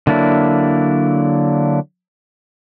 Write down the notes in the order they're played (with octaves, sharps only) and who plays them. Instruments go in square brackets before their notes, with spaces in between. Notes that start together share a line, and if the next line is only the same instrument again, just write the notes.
[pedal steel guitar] D3 F#3 A#3 D4 E4